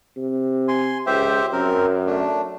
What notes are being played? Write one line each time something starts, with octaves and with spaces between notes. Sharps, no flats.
C3
G#5 C6
C#2 G4 C5 E5
F#2 C4 A#4
A3 D4